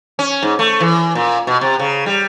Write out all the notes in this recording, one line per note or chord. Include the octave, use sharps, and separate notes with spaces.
C#4
G#2
A3
E3
A#2
B2
C3
C#3
G3